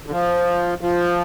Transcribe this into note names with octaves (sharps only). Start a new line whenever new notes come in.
D3
F3
F3